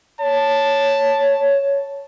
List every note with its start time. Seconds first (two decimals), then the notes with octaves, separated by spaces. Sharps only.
0.21 C#5 A5